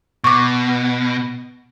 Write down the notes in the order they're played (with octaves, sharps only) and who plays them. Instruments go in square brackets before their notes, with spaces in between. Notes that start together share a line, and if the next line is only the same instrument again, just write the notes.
[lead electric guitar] B2 [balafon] C#6 D6